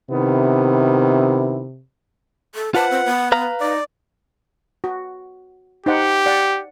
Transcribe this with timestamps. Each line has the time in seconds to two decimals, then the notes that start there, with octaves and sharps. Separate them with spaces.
0.10 C3 D#3 B3 E4
2.55 A4
2.74 F4 B4 C5 F#5 A5
2.91 C4
3.06 B3
3.32 B4 F5 A#5
3.61 D#4 D5
4.84 F#4
5.86 D#4 G4 C5 F#5
6.26 D5 F#5